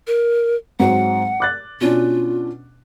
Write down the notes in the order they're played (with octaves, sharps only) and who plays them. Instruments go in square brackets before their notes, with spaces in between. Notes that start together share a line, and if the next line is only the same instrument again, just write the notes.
[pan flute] A#4
[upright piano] G#2 F#3 C4 [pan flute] F#5
[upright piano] D6 F#6 A6
[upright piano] B2 C#4 D4 [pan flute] F4